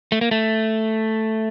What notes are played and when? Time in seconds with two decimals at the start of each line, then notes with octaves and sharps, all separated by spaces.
0.12 A3
0.21 A#3
0.31 A3